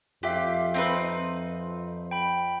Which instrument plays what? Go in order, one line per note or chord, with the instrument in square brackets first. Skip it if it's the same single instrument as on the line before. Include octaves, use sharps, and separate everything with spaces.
[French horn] F2 [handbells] F4 E5 F5 [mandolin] G4
[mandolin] C4 D#4 B4
[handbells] G5 B5